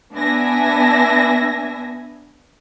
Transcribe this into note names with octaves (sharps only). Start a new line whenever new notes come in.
B3 D4 E5 G#5 A#6